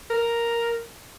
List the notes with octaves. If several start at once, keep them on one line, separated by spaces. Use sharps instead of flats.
A#4